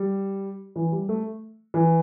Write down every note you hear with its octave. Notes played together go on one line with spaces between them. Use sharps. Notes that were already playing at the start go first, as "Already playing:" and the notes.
Already playing: G3
E3
G3
A3
E3